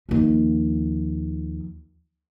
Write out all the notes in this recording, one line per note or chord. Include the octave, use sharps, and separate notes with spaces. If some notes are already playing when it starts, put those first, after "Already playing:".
D#2 F3